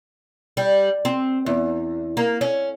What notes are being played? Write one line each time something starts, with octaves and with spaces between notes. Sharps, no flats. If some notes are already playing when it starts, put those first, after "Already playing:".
G3
C4
E2
A#3
C#4